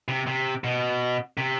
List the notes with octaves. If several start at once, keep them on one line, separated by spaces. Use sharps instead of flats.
C3
C3
B2
C3